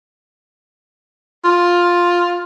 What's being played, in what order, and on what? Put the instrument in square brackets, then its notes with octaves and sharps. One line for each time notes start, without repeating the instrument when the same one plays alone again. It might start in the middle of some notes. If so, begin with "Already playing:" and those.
[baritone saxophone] F4